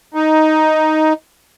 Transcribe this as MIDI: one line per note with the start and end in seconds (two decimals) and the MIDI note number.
0.14 1.13 63